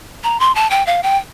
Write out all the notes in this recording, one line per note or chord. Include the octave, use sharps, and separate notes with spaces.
A#5
C6
A5
G5
F5
G5